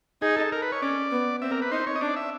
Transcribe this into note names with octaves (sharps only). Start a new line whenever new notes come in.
D#4 G#4
A4
A#4
B4
C#5
C#4 D5
B3
C4 E5
A#4
B4
D#4 C5
C#5
D#5
D4 D5
E5